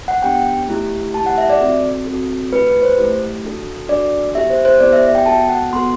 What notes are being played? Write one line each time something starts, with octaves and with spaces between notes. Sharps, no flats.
F#5
B3 D4 G4 G5
A3 E4 G4
A3 E4 G4 A5
F#5
E5
D5
C4 F#4 A4
C4 F#4 A4
A3 E4 G4 B4
B4
C5
A3 E4 G4
D4 F#4 A4
D4 F#4 A4 D5
B3 E4 G4 E5
C5
C5
B3 E4 G4 D5
E5
E5
G5
B3 F#4 A4 A5
F#5
B3 F#4 A4 C6